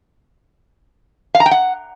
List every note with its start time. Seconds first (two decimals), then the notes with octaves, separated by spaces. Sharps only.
1.35 F5
1.40 A#5
1.46 G5
1.51 F#5